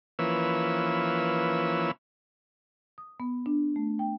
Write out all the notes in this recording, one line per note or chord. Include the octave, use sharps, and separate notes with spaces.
E3 F3 A#3 C#4 B4 E6
D#6
B3
D4
A3
G5